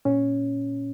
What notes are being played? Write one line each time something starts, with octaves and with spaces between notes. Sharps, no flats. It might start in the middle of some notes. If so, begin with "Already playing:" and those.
A#2 C#4